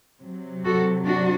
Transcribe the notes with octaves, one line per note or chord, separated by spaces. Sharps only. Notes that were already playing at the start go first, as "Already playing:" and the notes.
C3 F#3
F#4 A4
D4 F#4